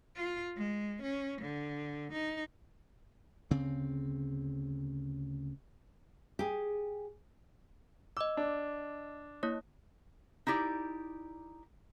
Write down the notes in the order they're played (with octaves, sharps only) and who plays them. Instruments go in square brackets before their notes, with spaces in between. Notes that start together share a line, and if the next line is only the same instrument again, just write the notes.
[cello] F4
G#3
C#4
D3
D#4
[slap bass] D2 C#3 C4
[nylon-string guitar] G4 G#4
[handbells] D#5 D6 [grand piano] E6
[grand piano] D4
[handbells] A#3 E4 C#5
[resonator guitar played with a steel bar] D#4 E4 G4 D5